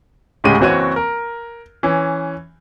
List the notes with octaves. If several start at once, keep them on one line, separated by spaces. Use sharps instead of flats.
D2 A2 C#3 G#3 G4 D#7
F#1 E3 C4 F#4 C#5 D#7
A#4
E3 C#4